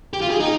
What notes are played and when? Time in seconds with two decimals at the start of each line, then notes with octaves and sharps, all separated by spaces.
0.13 G4
0.22 F4
0.30 G#4
0.40 D#4